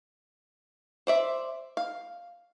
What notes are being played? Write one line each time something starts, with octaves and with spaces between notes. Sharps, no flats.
C5 D5 E5
F5